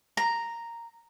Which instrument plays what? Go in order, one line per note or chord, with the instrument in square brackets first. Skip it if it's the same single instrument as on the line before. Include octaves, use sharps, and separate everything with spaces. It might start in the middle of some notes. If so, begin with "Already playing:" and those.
[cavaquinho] A#5